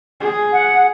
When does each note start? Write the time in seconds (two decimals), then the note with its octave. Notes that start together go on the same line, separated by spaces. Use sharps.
0.20 G#4
0.52 F#5